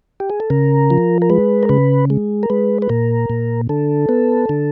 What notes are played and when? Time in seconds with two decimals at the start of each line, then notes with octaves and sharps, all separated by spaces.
0.20 G4
0.30 G#4
0.40 A4
0.50 C#3 A#4
0.90 F3
1.22 A#4
1.30 G#3 B4
1.63 A#4
1.69 C#3 B4
2.10 G#3
2.43 A#4
2.50 G#3 B4
2.82 B4
2.89 A#2 A#4
3.30 A#2
3.69 D3 A4
4.09 B3
4.49 D3